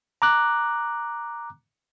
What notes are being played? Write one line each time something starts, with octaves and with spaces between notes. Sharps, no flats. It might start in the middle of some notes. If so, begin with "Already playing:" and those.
A#5 D6 F#6